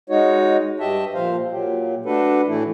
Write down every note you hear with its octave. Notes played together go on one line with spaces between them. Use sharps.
G#3 D#4 F#4 C#5
G2 G4 D#5 E5 A5
A#2 F3 C5 F5
A#2 F#3 G4
A3 D4 F#4 A4 B4
A2 E3 A3 E4